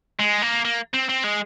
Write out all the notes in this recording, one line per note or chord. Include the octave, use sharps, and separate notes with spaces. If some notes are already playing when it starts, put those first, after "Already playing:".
G#3
A#3
A#3
C4
C4
G#3